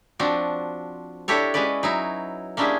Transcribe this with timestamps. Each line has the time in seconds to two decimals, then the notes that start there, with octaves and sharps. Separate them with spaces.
0.19 F3 C4 D4 F#4
1.28 D4 E4 G4 A4 C#5
1.54 G#3 C#4 F#4 B4 D5
1.83 F#3 D#4 E4
2.57 A#3 C#4 D4 E4 G4 G#4